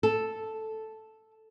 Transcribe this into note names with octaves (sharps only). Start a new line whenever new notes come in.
A4